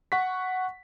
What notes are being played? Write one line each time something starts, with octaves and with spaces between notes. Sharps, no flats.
F#5 C#6 B6